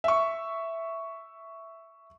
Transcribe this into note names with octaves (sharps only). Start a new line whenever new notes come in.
E5 C#6